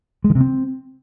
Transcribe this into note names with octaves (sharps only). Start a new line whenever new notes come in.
G#3
D#3
C3
C4